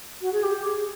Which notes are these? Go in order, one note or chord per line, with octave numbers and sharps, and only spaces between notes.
F#4
G#4
G4
G#4